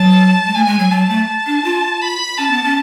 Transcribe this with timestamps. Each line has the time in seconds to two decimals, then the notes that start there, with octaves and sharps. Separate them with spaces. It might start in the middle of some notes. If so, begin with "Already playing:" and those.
Already playing: F#3 A5
0.46 G#3
0.54 A3 G#5
0.67 G#3
0.79 F#3
0.90 F#3 A5
1.09 A3
1.28 A5
1.46 D4
1.64 F4
2.02 B5
2.38 C#4 A5
2.51 B3
2.64 C#4